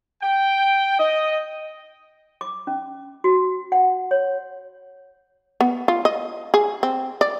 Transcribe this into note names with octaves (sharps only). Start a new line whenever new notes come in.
G5
D#5
D6
C#4
F#4
F#5
C#5
B3
F4
D#5
G#4
C4
D5